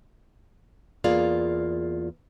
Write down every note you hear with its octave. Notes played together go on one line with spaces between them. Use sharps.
E2 A#3 F4 G#4 D5 F5